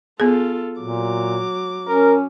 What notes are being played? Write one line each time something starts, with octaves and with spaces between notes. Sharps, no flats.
B3 F4 G#4 A4
A#2 F#3 D6
C#4 A#4